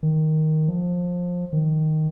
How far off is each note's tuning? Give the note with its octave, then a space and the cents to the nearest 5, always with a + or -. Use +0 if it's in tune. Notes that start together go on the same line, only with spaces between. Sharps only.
D#3 +5
F3 +20
D#3 +0